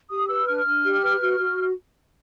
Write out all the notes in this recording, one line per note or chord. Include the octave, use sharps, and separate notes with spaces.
G4 D#6
B4 E6
D4 F6
D4
G4
B4
F#4
F#4